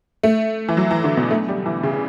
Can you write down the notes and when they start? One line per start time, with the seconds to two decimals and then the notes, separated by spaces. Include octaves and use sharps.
0.23 A3
0.68 E3
0.77 F#3
0.91 E3
1.04 D3
1.17 B2
1.31 A3
1.48 G3
1.66 E3
1.83 C#3